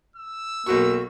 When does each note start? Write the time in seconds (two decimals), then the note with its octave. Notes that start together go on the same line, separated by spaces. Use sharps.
0.16 E6
0.66 B1 F#3 A#3 F#4 C#6